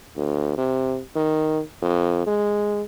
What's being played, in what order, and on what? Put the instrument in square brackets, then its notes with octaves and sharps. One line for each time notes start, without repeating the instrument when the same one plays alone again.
[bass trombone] D2
C3
D#3
F2
G#3